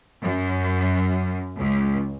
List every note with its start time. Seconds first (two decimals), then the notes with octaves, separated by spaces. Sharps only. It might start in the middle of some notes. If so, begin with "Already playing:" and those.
0.23 F#2
1.58 C#2